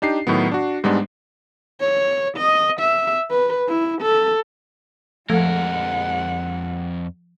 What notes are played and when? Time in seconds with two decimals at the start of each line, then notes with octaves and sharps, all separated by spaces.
0.02 D4 D#4 G4 C7
0.27 A2 D#3 F#3 B3
0.52 D4 F#4
0.84 G#2 G3 G#3 B3 D4
1.81 C#5
2.37 D#5
2.80 E5
3.31 B4
3.68 E4
4.02 A4
5.30 F2 F3 G#3 A3 A#4 F#5